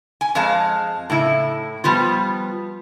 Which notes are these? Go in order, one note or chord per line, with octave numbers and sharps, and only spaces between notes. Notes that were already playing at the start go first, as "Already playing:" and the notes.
G#5
F2 G#3 F5 A5
A2 C#3 E4
F3 G3 B3 F4